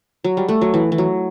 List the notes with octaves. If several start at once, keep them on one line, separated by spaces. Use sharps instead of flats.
F#3
G3
A3
F#3
E3
E3
F#3